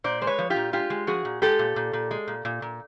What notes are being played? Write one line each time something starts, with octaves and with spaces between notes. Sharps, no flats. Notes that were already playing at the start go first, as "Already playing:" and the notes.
A#2 C5 D5
G#3 C5
B4 C#5
F3
F4 G4
A#2
G#3 F4 G4
G#3
F3 F#4 G#4
A#2
G#3 G4 A4
A#2
A#2
A#2
G#3
A#2
A#2
A#2